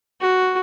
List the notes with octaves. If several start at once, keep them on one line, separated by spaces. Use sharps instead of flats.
F#4